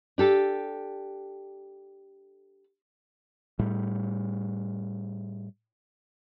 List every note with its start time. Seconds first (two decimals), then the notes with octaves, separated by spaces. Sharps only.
0.18 D4 G4 A4
3.59 A2 G3